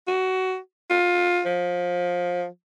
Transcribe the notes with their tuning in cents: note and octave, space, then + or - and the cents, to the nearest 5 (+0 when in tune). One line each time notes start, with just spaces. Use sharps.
F#4 +20
F4 +20
F3 +20